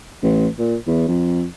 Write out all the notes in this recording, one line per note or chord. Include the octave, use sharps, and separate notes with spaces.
A1
A#2
E2
F2